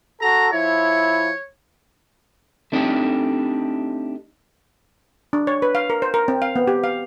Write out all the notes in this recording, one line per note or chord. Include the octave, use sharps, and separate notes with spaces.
F#4 A4 A#5
F3 E4 C#5
A3 C4 D4 D#4 F#4 G4
D4
C#5
B4
F5
A#4
C5
A#4
C4
F5
B3
G4
F5